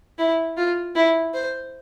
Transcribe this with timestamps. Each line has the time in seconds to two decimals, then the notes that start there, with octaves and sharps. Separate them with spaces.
0.18 E4
0.57 F4
0.95 E4
1.34 C5